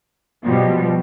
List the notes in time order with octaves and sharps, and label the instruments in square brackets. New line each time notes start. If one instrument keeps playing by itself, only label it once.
[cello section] B2 F3 G3